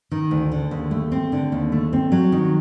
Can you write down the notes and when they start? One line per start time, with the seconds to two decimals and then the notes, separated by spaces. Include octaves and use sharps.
0.12 D#3
0.31 D2
0.52 D3
0.71 D#2
0.91 A3
1.12 C4
1.32 D3
1.52 D#2
1.72 A3
1.93 C4
2.12 F#3
2.32 D#3